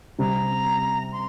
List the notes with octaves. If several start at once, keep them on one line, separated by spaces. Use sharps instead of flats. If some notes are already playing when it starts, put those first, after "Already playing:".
C3 G3 C4 A#5
C6